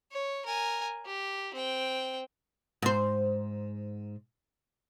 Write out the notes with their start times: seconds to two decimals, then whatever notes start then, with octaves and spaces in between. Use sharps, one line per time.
0.12 C#5
0.46 A#4 G#5
1.05 G4
1.54 C4 G5
2.82 G#2 C5